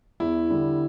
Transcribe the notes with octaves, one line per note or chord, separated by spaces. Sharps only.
E2 E4
D3 G3